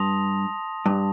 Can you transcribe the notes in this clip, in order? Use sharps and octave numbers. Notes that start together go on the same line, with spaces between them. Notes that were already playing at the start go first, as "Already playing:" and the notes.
Already playing: G2 A5 C6 D#6 A#6 F7
G2